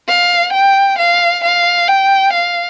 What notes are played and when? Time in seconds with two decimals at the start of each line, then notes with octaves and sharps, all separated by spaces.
0.08 F5
0.53 G5
0.99 F5
1.44 F5
1.88 G5
2.33 F5